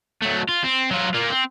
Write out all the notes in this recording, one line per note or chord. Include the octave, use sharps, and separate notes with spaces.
F#3 A3
F4
C4
F#3 F4
A#3 F4
C4